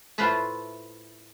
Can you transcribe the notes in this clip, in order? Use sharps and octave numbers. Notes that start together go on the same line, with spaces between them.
A2 F4 B4 C5 E5 A5